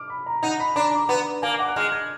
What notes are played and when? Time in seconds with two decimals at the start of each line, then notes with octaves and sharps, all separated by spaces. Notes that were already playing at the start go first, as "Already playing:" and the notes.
Already playing: D6 F6
0.10 B5
0.26 A#5
0.43 D#4 F#5
0.60 B5
0.76 D4 A#5
1.09 B3
1.42 A#3 G#5
1.59 F#5
1.68 F#6
1.76 G#3 F6
1.92 G#6